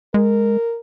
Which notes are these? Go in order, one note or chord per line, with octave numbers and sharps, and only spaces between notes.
G#3 A#4